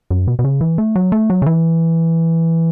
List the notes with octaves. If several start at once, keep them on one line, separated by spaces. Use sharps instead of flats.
F#2
B2
B2
C#3
E3
A3
F#3
A3
F#3
C#3
E3